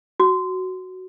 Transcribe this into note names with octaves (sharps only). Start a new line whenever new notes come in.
F#4